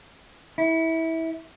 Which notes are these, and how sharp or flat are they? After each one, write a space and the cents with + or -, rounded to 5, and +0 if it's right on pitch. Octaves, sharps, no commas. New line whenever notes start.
E4 -20